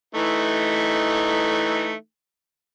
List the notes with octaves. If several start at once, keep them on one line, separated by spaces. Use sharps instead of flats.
E3 A3 D#4